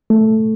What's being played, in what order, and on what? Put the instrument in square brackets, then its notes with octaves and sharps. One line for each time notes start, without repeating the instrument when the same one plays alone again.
[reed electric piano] A3